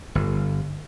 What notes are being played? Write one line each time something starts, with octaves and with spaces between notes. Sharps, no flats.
G1